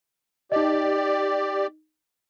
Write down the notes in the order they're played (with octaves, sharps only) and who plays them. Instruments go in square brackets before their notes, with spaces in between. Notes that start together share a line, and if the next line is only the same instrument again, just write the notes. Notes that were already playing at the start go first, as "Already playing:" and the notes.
[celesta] D#4 D#5 [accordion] G4 D5